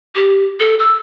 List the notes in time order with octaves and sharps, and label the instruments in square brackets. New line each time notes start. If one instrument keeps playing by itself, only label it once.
[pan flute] G4
A4
E6